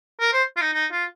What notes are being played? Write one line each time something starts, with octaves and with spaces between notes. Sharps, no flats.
A#4
C5
F4
D#4
D#4
F4